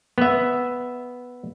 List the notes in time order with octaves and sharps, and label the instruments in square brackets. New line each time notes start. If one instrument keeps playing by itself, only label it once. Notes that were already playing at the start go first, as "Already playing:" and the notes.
[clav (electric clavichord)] B3 E5